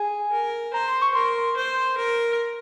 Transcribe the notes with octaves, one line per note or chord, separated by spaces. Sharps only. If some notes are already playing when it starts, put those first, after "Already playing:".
Already playing: G#4 G#5
A#4
C5 A#5
C6
C#6
A#4 C6
C5
A#4